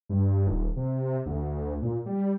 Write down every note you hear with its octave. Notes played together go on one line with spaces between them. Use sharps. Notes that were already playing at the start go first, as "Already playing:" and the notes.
G2
D#1
C3
D2
A#2
G3